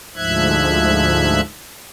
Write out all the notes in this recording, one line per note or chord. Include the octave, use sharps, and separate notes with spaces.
D2 G#2 F3 E5 F#6 G#6